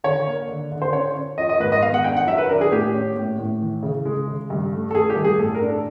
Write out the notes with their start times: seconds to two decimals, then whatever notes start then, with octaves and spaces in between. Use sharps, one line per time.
0.04 D3 C#5
0.27 A#3
0.48 D3
0.72 D3
0.82 C5
0.93 C#4 C#5
1.16 C#4
1.38 F3 D#5
1.49 D#5
1.60 G#2 B4
1.72 D#5
1.82 B3 F5
1.94 F#5
2.04 D4 G5
2.17 F#5
2.27 F#3 E5
2.38 B4
2.49 D4 A#4
2.61 G#4
2.72 A2 G4
2.94 C#4
3.16 A2
3.38 A2
3.61 E3
3.83 C#3
4.05 G#3
4.28 C#3
4.50 G2
4.73 A3
4.91 A4
4.95 A3 G#4
5.10 G4
5.16 G2
5.25 G#4
5.39 A2 A4
5.55 A#4
5.62 D4
5.69 A4